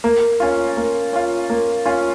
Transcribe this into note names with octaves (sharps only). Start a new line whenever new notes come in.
A#3
C#4 F4
A#3
C#4 F4
A#3
C#4 F4